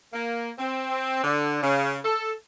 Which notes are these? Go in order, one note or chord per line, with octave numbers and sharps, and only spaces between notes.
A#3
C4
D3
C#3
A4